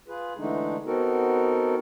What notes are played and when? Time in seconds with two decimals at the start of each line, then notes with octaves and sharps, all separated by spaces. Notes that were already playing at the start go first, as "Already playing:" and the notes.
0.08 F4 G#4 B4
0.38 D3 E3 G#3 A3 D4 D#4
0.86 B3 C4 D#4 F#4 A4 A#4